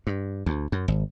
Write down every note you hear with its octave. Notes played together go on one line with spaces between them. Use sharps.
G2
D2
F#2
G#1